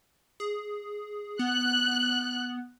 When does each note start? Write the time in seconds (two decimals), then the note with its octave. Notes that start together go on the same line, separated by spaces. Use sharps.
0.40 G#4
1.39 B3 F#6